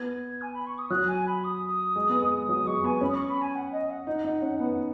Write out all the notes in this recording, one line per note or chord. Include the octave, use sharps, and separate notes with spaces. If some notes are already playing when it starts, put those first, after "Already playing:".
Already playing: B3 G#6
G#5
B5
C#6
D#6
F#3 F#6
G#5
B5
D#6
G#3
B3
G#3
F#3 D#6
G#3 C#6
B3 G#5
C#4 B5
D#6
C#6
B5
G#5
F#5
D#5
F#5
D#4
D#4
C#4
B3